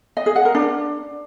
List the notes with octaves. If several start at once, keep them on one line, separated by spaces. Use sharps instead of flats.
D#5
G#4
F#5
A#4
D4